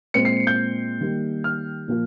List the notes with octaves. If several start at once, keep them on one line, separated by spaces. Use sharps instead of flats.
A#2 G#3 C4 C#7
C7
G6
D#3 G3 A#3
F6
A#2 F3 A#3